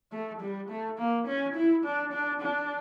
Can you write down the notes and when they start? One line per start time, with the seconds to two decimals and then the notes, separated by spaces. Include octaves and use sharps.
0.12 A3
0.40 G3
0.69 A3
0.98 A#3
1.27 C#4
1.55 E4
1.84 D4
2.13 D4
2.41 D4